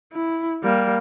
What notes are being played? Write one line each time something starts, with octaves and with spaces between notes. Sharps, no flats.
E4
G3 A#3